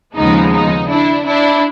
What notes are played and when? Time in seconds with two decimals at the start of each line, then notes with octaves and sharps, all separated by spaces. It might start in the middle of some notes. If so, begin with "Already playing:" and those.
0.16 D#2 C#3 F3 G#3 B3 D#4
0.53 D#4
0.89 D4 E4
1.26 D4 E4